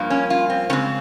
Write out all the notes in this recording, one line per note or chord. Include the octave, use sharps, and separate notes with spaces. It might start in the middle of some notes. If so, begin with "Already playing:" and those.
Already playing: G2 F3 A#3
C#4
F4
C4
C#3 G#3 C4 C#4